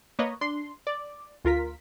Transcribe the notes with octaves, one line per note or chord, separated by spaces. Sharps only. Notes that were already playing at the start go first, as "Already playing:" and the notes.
A#3 B4 C#5 D#5
D4 C6
D5
D2 F4 A#4 B6